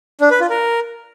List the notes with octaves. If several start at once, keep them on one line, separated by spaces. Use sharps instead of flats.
D4
B4
F4
A#4